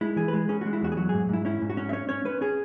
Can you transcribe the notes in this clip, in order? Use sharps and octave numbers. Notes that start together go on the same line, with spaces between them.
G#3 E4
E3 G#4
B4
G#3 G#4
C#4 G#4
G#3 F#4
E4
E2 F#4
G#4
F#3 F#4
G#2 G#4
G#2 E4
C#4 E4
G#2
F#4
C#4
E5
C#4 C#5
C#4 C#5
C#4 B4
C#4 G#4